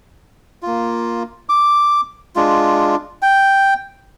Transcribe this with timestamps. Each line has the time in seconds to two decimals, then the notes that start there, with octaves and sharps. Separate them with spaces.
0.62 A#3 F4
1.49 D6
2.35 G#3 D4 F4
3.22 G5